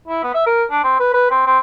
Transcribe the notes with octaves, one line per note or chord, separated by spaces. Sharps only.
E4
B3
E5
A#4
D4
C4
B4
B4
C4
C4